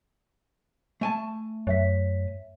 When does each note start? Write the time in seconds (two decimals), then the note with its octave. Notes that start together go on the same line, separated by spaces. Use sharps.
1.01 A3 G#5 A5
1.67 F#2 C#5 E5 B6